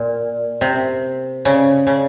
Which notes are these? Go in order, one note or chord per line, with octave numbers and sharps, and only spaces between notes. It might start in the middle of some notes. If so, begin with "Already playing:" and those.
Already playing: A#2
C3
C#3
C#3